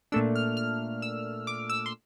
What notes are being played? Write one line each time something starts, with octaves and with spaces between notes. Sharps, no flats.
A#2 A3 D4 E6
F6
F6
E6
D6
E6
C6